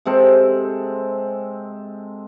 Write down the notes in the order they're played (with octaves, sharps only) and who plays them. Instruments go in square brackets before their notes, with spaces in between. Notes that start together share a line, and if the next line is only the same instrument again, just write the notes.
[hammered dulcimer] C3 G#3 C4 A4